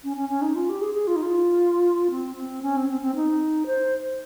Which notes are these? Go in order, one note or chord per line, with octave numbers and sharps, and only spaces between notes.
C#4
C#4
C#4
D#4
F4
G4
G#4
G#4
F4
D#4
F4
C4
C4
C#4
C4
C4
C4
D#4
C5